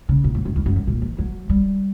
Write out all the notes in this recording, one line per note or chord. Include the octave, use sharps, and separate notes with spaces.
C#3
A#2
F#2
F#2
E2
F#2
G2
A#2
E3
F#3
G3